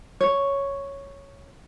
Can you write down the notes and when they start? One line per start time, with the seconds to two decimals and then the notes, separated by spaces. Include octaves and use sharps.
0.21 C#5